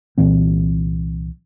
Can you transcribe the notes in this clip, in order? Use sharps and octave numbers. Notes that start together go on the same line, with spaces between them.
C2 A#2 E3 C4